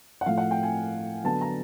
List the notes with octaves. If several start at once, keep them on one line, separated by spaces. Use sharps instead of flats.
F#5
A2 F3 A3 F5
F#5
G5
G#5
D3 F#3 B3 A5
A#5